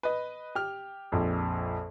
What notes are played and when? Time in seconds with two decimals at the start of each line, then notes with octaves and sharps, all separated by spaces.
0.03 B4 D#5
0.55 G4 F6
1.12 A#1 F2